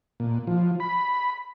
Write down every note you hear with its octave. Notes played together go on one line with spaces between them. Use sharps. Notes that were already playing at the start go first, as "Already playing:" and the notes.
A#2
F3
B5